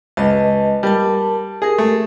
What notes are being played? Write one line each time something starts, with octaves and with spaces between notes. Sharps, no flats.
C#2 B4 D#5 A5
G3 A#4 A5
G4 G#4 A#4
A3